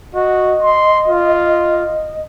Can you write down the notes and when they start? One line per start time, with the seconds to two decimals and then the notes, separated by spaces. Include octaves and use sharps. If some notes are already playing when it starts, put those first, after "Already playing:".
0.14 F#4 D#5
0.63 C6
1.08 F4